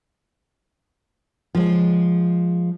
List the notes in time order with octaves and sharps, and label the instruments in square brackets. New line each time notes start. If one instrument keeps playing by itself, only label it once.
[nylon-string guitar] F3 G#3